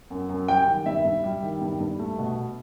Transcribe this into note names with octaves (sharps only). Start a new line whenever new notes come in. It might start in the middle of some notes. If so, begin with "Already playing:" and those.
F#2
F#2
G3 G5
D#3
G2 E5
G2
G3
D#3
G2
G2
A3
B2